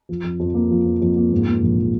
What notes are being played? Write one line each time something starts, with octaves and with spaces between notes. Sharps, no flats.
F3
F2
F2
A#3
F3
F2
F2
A#3
G#2
A#3
A#1
F3